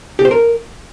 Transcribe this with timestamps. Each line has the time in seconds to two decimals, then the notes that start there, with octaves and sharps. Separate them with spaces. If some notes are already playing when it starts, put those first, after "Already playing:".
0.19 G4
0.25 C5
0.31 A#4